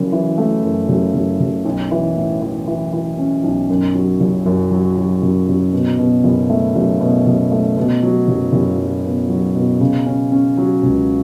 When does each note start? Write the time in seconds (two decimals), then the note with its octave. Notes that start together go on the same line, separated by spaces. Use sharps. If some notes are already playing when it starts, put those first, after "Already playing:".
Already playing: F#1 F#2
0.12 E3
0.38 A3
0.63 F#2
0.89 F#1
1.14 F#1
1.40 F#1
1.65 B1
1.91 E3
2.17 A2
2.42 E3
2.67 E3
2.93 E3
3.18 C#4
3.44 B1
3.69 F#2
3.94 F#3
4.20 F#1
4.46 F#2
4.71 F#3
4.97 F#3
5.22 F#1
5.48 F#1
5.73 B2
5.98 B2
6.24 F#1
6.50 A3
6.75 F#1
7.00 B2
7.26 F#1
7.52 A3
7.77 B2
8.03 F#3
8.28 F#1
8.53 F#1
8.78 F#3
9.04 B2
9.29 F#3
9.55 B2
9.80 C#3
10.06 C#4
10.32 C#4
10.57 F#3
10.83 C#2